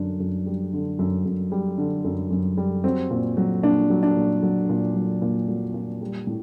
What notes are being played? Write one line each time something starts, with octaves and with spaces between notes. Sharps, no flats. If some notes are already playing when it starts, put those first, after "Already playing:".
Already playing: F#2 D3 D4
F#2
G3
D3
F#2
F#2
G3
D3
F#2
F#2
G3
F#3 C4
A#2
F#3
A#2 D4
F#3
D4
A#2
F#3
A#2
F#3
A#2
F#3
A#2
G3
A2